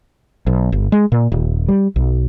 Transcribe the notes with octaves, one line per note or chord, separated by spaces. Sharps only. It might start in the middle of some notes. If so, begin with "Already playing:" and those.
B1
G1
G#3
A#2
D#1
G3
B1